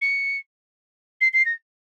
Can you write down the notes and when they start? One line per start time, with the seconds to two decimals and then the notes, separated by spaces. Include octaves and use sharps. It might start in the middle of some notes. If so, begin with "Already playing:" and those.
0.02 C#7
1.21 C7
1.33 C7
1.46 A#6